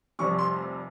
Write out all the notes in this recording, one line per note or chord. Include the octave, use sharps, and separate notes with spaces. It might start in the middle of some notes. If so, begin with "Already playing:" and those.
F1 F2 C3 G3 C#6
C6